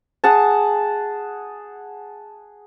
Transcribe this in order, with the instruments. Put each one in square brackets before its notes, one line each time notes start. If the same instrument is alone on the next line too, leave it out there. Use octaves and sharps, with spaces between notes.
[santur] G#4 F#5 A5